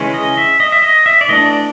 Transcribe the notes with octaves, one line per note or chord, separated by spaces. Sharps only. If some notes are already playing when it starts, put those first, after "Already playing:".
Already playing: C#3 E3 G#3 C#4
D#5
E5
D#5
E5
D#5
E5
D5
E3 A3 D4 D#5
D5